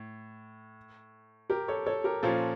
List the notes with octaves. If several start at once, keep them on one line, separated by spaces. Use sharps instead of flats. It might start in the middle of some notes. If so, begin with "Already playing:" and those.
Already playing: A2
G4 A#4
A4 C#5
A4 C#5
G4 A#4
A#2 F3 C#4 F4 A4